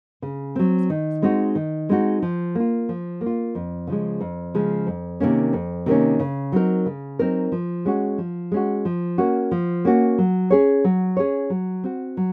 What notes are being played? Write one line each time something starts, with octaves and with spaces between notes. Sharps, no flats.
C#3
F#3 C4
D#3
G#3 C4 D#4 F#4
D#3
G#3 C4 D#4 F#4
F3
A#3 F4
F3
A#3
F4
F2
C#3 F3 G#3
F2
C#3 F3 G#3
F2
C3 D#3 A#3 C#4
F2
C3 D#3 A#3 C#4
C#3
F#3 C4 D#4 A#4
C#3
F#3 C4 D#4 A#4
F3
G#3 C#4 F#4
F3
G#3 C#4 F#4
F3
A#3 C#4 F#4
F3
A#3 C#4 F#4
F#3
C#4 G#4 C#5
F#3
C#4 G#4 C#5
F#3
C4 F#4
F#3